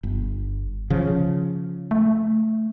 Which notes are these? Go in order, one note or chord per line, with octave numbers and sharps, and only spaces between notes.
G1
C#3 F3
A3